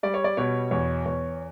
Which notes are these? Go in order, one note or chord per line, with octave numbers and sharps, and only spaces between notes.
G3 D5
C#5
D5
B2 C#5
E2 C#5
E2 C#5